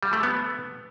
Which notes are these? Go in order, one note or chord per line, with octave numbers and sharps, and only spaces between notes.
G3
A3
B3